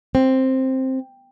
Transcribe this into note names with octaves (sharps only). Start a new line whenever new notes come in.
C4